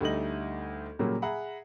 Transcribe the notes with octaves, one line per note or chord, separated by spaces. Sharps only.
D2 G3 A3 D#4 D#5 F#7
A#2 C#3 F#3 G3 A#3
G#4 E5 F#5 A#5 B5